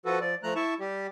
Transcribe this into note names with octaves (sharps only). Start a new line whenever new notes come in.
F3 F#4 A4 B4
F3 D5
F3 A3 A#5 F#6
E4 E5 A5 C#6
G3 G4